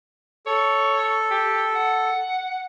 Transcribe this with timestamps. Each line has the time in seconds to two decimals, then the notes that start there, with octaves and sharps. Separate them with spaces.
0.46 A4 C#5
1.31 G4
1.75 F#5